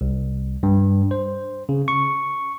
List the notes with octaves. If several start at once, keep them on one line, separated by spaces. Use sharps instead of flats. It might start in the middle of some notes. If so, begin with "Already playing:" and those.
C2
G2
C5
C#3
C#6